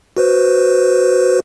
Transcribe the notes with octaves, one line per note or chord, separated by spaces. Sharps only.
F#4 B4 C5